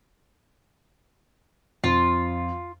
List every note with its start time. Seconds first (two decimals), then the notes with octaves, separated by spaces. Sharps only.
1.84 F2 F4